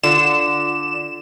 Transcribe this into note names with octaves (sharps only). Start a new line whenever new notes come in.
D3 F4 A4 D5 E7